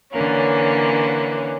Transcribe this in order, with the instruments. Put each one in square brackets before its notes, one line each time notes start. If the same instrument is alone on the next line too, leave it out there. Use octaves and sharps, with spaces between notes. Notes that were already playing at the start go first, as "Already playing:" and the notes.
[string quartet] D3 E3 A#3 C#4